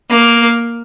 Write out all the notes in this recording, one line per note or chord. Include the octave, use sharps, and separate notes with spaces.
A#3